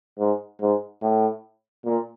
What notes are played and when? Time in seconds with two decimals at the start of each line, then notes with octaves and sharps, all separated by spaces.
0.19 G#2
0.61 G#2
1.01 A2
1.85 A#2